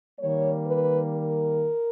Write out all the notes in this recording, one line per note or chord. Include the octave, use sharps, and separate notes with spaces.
D#3 G3 A#3 C#5
B4
A#4